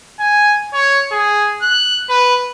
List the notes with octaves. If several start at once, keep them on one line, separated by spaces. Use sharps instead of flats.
G#5
C#5
G#4
F#6
B4